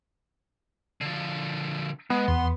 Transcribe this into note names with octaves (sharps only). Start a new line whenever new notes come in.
D3 F3
G#3 B3
E2 C6